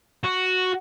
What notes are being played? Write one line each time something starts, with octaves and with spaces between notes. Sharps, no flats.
F#4